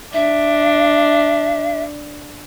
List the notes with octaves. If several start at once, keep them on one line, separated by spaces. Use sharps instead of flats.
D4 E5